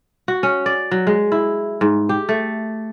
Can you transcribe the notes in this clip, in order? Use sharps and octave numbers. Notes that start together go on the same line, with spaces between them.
F#4
C#4
D5
F#3
G#3
E4
G#2
G4
A3